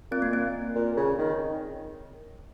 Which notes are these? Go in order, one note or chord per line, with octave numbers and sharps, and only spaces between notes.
A#2 C4
A#3
C4
A#2
C#3
D#3